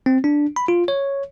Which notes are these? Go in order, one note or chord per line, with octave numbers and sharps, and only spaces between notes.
C4
D4
B5
F4
C#5